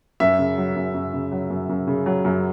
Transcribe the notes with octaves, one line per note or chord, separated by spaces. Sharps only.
F#2 E5
C#3
F#3
F#2
F#2
C#3
F#3
F#2
F#2
C#3
F#3
F#2